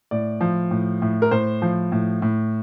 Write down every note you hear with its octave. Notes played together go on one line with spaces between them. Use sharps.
A2 D5
F3
A2
A2
A#4
A2 C5
F3
A2
A2